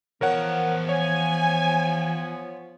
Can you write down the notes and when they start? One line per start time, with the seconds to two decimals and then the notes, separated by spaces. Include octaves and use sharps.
0.21 E2 F3 B3 A#4 C#5 F#5 A5
0.89 C#5 G#5